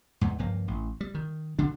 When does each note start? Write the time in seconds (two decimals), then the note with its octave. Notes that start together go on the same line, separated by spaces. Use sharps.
0.21 E2 G#2
0.39 C#2 G2 F3 A#3
0.68 A1
1.01 G3
1.15 D#3
1.59 D2 D3 D4